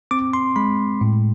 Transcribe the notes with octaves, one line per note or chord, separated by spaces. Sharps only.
C4 D6
C6
G#3 B5
A2